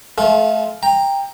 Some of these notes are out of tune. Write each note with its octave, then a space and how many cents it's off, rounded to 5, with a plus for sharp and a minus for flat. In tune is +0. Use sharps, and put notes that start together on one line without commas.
A3 -25 F4 +0 A4 -40
G5 +15 A#5 +0